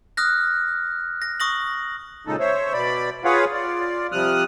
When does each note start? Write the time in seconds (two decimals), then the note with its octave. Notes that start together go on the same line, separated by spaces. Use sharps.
0.17 D#6 F6 F#6 A#6
1.22 A#6
1.40 C#6 D#6 A#6 F#7
2.27 A#2 C#3 G#3 D#4 A4
2.40 C5 C#5 E5
2.73 B2 D5 B5
3.25 F4 G#4 B4 C#5 F5 F#5
3.53 F4 D5
4.12 C3 F3 G3 D#6 F6 F#6